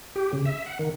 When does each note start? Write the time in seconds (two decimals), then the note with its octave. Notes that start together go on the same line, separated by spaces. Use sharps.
0.16 G4
0.33 C#3
0.45 E5
0.66 F#5
0.79 D#3